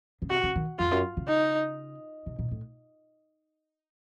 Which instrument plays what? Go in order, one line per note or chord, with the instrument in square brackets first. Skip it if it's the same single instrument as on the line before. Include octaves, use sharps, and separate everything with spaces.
[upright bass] C#3
[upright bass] C3 [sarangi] F#4
[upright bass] C#3
D#3
[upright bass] F2 [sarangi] F4
[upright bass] F#2
C#3
[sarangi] D#4
[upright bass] C3
A#2
A2